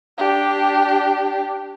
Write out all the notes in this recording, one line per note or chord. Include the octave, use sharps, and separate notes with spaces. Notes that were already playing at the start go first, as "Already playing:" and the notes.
D4 G4